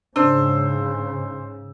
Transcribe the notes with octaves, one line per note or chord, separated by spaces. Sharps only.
G#2 C#3 D4 C5 E6